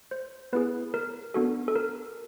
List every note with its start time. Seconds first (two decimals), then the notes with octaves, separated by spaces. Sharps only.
0.11 C5
0.53 B3 E4 G#4 B4
0.94 A#4
1.34 B3 D4 F#4 A4
1.68 A4
1.76 A#4